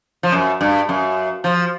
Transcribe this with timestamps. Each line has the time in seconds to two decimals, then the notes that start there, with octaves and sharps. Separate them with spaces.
0.23 F3
0.32 F#2
0.61 G2
0.89 F#2
1.44 F3